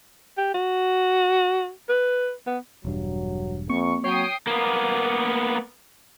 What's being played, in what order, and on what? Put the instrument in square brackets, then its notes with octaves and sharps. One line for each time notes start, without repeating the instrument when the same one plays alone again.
[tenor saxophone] G4
F#4
B4
B3
[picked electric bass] E1 G2 [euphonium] F#3
[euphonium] F2 [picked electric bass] A#3 C4 [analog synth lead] C#6
[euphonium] F#3 [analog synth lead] C#5 [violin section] G5 D#6 C7
[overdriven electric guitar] A#3 B3